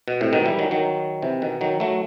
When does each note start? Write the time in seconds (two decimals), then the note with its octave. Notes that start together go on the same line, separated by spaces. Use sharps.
0.08 B2
0.21 A2 C3
0.33 B2 D#3
0.46 E3 G3
0.59 D#3 F#3
0.71 D#3 F#3
1.22 C3 E3
1.42 B2 D#3
1.61 D#3 F#3
1.80 F#3 A3